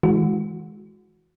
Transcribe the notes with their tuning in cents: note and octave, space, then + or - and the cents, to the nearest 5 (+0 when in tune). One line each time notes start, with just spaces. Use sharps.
E3 -25 G#3 +5 F#4 -25